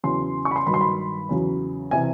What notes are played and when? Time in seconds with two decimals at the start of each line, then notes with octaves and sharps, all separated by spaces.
0.03 E2 C#3 F#3 C6
0.45 C#6
0.51 B5
0.56 C6
0.67 G2 D#3 F#3 B5
0.74 C6
0.81 B5
1.29 E2 C#3 F#3
1.91 C3 E3 G#5